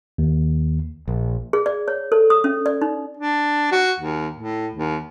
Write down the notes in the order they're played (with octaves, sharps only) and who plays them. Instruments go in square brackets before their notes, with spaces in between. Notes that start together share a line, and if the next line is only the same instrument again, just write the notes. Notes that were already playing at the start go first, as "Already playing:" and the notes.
[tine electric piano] D#2
[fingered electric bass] A#1
[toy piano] G#4
D5
C#5
A4
D#6
C#4
D5
D#4
[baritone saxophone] D4
F#4
D#2
A2
D#2